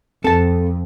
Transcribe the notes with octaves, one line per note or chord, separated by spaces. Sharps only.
F2 C4 A4 A5